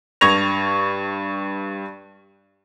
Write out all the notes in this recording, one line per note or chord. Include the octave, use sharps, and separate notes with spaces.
G2 C#6 G#6 A#6 F7